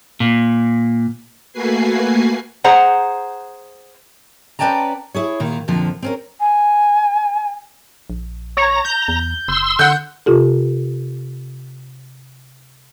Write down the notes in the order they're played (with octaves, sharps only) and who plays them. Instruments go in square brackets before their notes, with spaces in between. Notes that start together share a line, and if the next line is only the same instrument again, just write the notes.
[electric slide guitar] A#2
[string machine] A3 A#3 F#4 B4 G#5 C7
[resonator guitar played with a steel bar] G#4 C5 F#5 A#5
[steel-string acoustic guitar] C#4 B4 D5 G5 A5 A#5
E4 G#4 C#5
A#2 D#3
F2 A#2 D3 F3
C4 C#4 A#4
[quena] G#5
[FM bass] A#1
[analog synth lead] C#5 [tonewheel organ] A#5
[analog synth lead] G6
[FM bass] E2
[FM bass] F#1 [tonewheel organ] C6 E6
[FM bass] D3 [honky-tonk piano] F#5 G6
[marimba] C3 F4 G4 A4